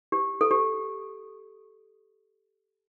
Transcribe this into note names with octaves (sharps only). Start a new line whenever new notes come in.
G4
A4
G4